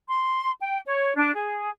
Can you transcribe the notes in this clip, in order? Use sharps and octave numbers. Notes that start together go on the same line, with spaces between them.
C6
G5
C#5
D4
G#4